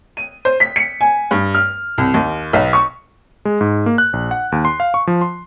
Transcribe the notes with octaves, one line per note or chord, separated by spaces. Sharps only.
D#7
C5
B6
C#7
G#5
G2
F6
C2
D#2
B1
C#6
G#3
G#2
A#3
F#6
A#1
F#5
D#2
C6
F5
C#6
F3
C6